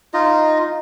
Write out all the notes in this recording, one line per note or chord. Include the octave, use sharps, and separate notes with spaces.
D#4 F4 D#5